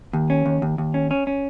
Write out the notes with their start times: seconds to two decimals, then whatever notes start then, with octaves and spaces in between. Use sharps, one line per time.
0.13 D#2
0.30 C#4
0.46 D#2
0.62 D#2
0.78 D#2
0.94 C#4
1.11 C#4
1.27 C#4